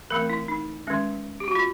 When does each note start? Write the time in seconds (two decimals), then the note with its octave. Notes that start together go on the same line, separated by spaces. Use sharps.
0.10 E3 A3 C4 A#4
0.30 E4
0.48 D#4
0.87 D#3 G#3 C#4
1.40 G4
1.48 F#4
1.55 F4